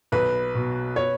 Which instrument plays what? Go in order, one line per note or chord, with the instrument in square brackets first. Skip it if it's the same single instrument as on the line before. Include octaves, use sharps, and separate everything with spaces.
[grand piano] B1 [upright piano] B4
[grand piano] B2
[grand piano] B3 [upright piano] C#5